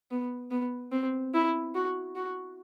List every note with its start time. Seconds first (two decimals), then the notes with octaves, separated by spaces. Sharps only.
0.11 B3
0.51 B3
0.92 C4
1.34 E4
1.75 F#4
2.16 F#4